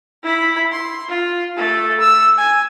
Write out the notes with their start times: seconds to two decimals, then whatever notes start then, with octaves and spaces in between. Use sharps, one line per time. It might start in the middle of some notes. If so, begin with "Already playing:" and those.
0.23 E4 B5
0.72 C6
1.09 F4
1.57 A3 A4
2.00 E6
2.38 G#5